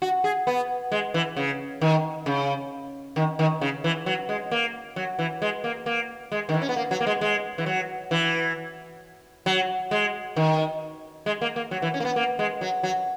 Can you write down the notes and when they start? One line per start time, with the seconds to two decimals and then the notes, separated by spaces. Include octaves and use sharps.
0.02 F#4
0.24 G#4
0.47 B3
0.92 G#3
1.14 E3
1.36 C#3
1.81 D#3
2.26 C#3
3.16 D#3
3.39 D#3
3.61 C#3
3.84 E3
4.06 F#3
4.29 G#3
4.51 A#3
4.96 F#3
5.19 E3
5.42 G#3
5.64 A#3
5.86 A#3
6.32 G#3
6.49 D#3
6.54 E3
6.62 C#4
6.69 B3
6.76 A#3
6.91 F#3
7.01 A#3
7.07 G#3
7.21 G#3
7.58 E3
7.66 F#3
8.11 E3
9.46 F#3
9.91 G#3
10.36 D#3
11.26 G#3
11.41 A#3
11.56 A#3
11.71 F#3
11.82 E3
11.94 C#4
12.00 A#3
12.05 B3
12.16 A#3
12.39 G#3
12.61 F#3
12.83 F#3